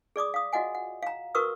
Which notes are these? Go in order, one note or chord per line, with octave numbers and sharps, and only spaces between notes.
G#4 D5 D6 D#6
F5 D#6
F4 F#4 D#5 F#5 G#5
F#5
F5 A#5
F#4 A#4 B4 C#6 D#6 E6